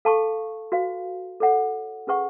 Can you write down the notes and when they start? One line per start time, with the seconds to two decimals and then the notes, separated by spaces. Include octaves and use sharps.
0.05 A4 F5 A5 C#6
0.72 F#4 B4 F5
1.40 A4 C#5 F#5
2.07 C#4 G#4 B4 F#5 C#6